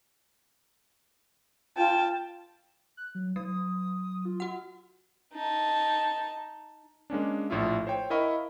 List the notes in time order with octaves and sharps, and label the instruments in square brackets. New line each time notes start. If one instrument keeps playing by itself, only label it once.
[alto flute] F4 [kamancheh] G5 A5
[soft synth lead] F#6
F#3
[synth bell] F#3 [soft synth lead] D#6
[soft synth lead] F4
[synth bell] F#4 F#5
[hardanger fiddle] D#4 A5
[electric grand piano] G#3 A#3 C#4 D4
A#1 A2 E4 F4 E5
C5 C#5 G5
E4 A#4 D#5 F5 B5 C#6